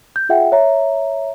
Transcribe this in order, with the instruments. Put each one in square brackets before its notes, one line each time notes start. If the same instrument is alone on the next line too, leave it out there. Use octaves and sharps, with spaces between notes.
[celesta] G6
F4 G#4 E5 F#5 G5
C#5 E5 A#5